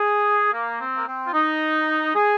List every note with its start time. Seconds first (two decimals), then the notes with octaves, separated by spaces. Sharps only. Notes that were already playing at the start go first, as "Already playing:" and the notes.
Already playing: G#4
0.52 A#3
0.79 C4
0.95 A#3
1.06 C4
1.26 F4
1.33 D#4
2.14 G#4